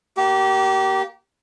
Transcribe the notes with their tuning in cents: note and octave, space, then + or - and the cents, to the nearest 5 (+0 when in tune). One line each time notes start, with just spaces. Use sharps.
A#3 +0 G4 -30